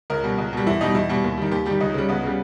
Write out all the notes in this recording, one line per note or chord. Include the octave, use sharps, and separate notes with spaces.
C#2 A#4
B2 G3
C#2
B2 G3
E2 E4
B2 G3 D#4
E2 E4
B2 G3
D#2
D#3 G3
D#2 G4
D#3 G3 G4
C#2 D#4
C#3 G3
C#2 B3
C#3 G3